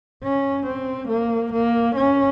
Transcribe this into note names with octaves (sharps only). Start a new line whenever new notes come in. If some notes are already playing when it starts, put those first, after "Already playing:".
C#4
C4
A#3
A#3
C#4